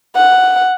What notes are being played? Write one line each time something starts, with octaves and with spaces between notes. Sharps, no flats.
F#5